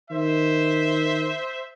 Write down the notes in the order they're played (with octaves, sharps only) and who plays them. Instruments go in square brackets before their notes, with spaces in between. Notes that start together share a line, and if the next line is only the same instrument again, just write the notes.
[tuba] D#3 [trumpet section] C5 E5